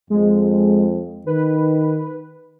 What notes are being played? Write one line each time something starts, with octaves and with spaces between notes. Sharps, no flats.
F2 G#3
D#3 B4